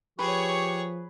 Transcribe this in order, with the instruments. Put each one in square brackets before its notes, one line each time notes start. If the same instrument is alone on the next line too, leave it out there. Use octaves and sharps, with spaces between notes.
[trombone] F3 [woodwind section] G4 C#6 [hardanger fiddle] G#4 C#5 [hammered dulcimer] B4